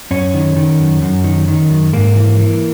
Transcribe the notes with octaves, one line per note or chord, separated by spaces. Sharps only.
F#2 C#4
D#3
D#3
F#2
F#2
D#3
D#3
F#2
G#2 A#3
E3
E3